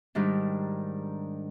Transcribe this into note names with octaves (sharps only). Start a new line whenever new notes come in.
G#2 D#3 G3 D4